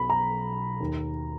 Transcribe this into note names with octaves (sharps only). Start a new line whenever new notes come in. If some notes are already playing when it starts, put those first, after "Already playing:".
Already playing: B1 B2 B5
A#5
D#2 D#3